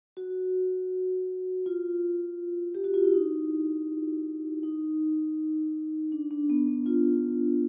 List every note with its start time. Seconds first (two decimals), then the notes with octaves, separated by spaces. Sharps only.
0.17 F#4
1.66 F4
2.75 G4
2.84 F#4
2.94 F4
3.04 E4
3.14 D#4
4.63 D#4
6.12 D4
6.31 D4
6.50 B3
6.67 B3
6.86 F4